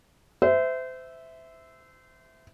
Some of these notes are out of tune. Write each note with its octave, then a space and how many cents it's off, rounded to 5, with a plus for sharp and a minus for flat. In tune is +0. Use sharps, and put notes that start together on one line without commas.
C5 -30 E5 -5